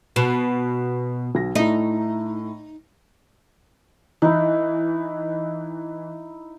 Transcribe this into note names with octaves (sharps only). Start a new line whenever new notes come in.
B2 E7
B1 A#6
A2 A3 D#4
E3 D#4 E4